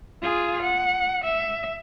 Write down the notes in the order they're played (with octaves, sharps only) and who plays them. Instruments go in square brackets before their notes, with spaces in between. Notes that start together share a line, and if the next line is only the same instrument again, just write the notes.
[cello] F4 G#4
F#5
E5